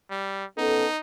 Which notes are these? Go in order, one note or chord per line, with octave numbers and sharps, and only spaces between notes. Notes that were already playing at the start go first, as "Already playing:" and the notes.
G3
B3 C#4 D#4 A4